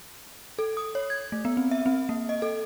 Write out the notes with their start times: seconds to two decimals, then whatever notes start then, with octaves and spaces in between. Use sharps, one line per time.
0.59 A4
0.77 D#6
0.95 C#5
1.10 G#6
1.32 A3
1.45 B3
1.57 C4
1.71 E5
1.86 C4
2.09 A#3
2.29 D#5
2.42 A4